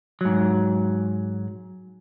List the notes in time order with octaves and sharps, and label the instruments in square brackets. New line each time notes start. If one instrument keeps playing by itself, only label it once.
[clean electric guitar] G#2 F#3